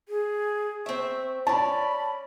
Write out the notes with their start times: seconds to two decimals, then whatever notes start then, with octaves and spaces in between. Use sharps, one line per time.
0.09 G#4
0.86 C4 E5 C#6
1.47 C#4 D5 A5 B5